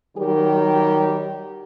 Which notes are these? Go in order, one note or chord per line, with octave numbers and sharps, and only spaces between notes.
D#3 F#3 G3 G4 A#4